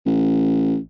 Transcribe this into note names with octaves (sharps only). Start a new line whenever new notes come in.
A1